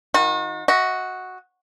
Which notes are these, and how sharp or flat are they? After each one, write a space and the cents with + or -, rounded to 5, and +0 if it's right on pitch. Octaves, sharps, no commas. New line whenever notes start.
D#3 +15 F#4 -40
F#4 +0 D#5 +40